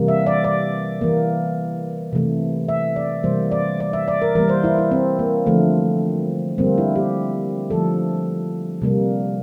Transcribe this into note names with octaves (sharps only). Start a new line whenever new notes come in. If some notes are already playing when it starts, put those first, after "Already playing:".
Already playing: C3 E3 G3 A#3
E5
D5
D5
E3 A#3
C3 E3 A3
E5
D5
C3 E3 G3 A#3 C5
D5
D5
E5
D5
A#4
E3 G3 A#3 A#4
C5
E4
E4
C4
A#3
D3 F3 A3
D3 G3 A#3 C4
E4
G4
D3 F3 A3 A4
C3 G3 A#3